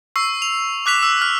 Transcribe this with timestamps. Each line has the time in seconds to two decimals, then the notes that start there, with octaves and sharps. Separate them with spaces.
0.16 C#6 E6 C7
0.42 F7
0.86 D6 F#6 B6 F7
1.03 E6
1.22 F6